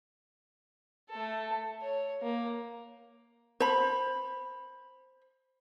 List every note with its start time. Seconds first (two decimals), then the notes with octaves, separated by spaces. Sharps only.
1.10 A3 A4
1.81 C#5
2.22 A#3
3.60 C5 B5